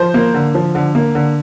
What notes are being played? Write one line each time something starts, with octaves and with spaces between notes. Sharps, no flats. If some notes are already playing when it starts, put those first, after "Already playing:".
Already playing: F3 C5
A#3
D3
F3
D3
A#3
D3